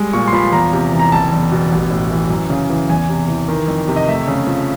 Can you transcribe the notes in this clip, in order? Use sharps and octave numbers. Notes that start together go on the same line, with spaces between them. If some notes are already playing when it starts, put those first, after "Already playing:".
Already playing: G3 G#3
A#2 C#6
C6
F3 B5
E2 A#5
C3
E3
A#5
F#1 A5
E2
B2
A1
A2
E3
F#2
C#3
E3
E2 G#5
C3
E3
D#3
F2
C3
D#5
A3 E5
C#3
F3